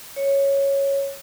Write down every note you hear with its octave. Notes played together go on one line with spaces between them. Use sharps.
C#5